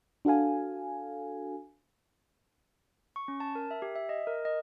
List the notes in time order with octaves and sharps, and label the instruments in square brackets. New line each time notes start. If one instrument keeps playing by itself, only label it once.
[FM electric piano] D4 F#4 A4 F5 G#5
[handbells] C#6
C#4
A5
A#4
E5
G4
E5
D#5
A#4
D#5